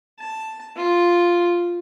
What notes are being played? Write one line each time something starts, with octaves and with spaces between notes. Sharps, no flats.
A5
F4